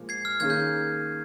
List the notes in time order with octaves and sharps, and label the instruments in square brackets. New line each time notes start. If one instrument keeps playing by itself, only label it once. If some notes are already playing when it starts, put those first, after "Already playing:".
Already playing: [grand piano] A#2 F3 G#3
[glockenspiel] G#6 C7
F6
[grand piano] D#3 A#3 C#4 G#4 [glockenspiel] F6 G#6
[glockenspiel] G6